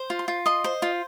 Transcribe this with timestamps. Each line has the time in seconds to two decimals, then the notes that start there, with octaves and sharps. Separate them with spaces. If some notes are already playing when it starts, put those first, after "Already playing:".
Already playing: C5
0.10 F4
0.19 C6
0.28 F4
0.46 D#5 C6
0.64 C5
0.82 F4